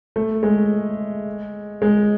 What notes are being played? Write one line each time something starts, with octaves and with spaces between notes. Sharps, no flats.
A3
G#3
G#3